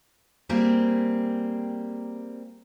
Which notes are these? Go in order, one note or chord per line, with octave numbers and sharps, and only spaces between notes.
G3 A#3 C4 G4 G#4